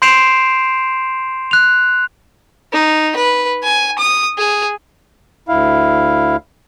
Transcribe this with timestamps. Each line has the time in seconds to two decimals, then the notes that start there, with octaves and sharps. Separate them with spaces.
0.02 C6 G6 C7 D7 E7 F7
1.51 F#6 F7
2.73 D#4
3.16 B4
3.64 G#5
3.98 D#6
4.38 G#4
5.49 D2 E4 F5